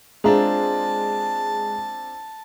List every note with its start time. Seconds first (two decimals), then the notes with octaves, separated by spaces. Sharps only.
0.24 G#3 C4 D4 F4 G#4 E5 A5 A#5